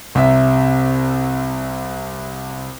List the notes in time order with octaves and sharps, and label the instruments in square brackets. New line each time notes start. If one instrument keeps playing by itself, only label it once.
[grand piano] C2 C3 E5